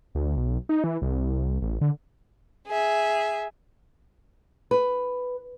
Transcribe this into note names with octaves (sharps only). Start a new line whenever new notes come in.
D2
B1
D#4
E3
C2
A1
D3
G#4 E5
B4